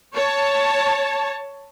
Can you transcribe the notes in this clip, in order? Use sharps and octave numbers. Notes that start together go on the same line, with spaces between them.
C#5 A5